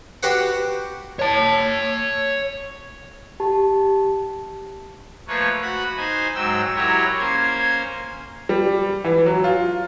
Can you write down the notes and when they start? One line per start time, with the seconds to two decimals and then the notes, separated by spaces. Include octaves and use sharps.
0.23 F#4 G4 B4 C5 F#5
1.19 C#5 A5
3.40 G4 A5
5.28 F3 A3 A#3 B4 C#5
5.62 F#4 F#5 B5
5.97 D#4 C5 G#5
6.35 G#2 F#3 G5 E6
6.75 F#3 E4 G4 A#4 C#5
7.19 A#3 C#4 C5 G#6
8.49 G3
9.04 E3
9.26 F#3
9.44 F4